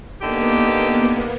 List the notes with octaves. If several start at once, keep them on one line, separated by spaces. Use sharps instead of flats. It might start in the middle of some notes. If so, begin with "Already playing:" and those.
D3 A#3 B3 D#4 G4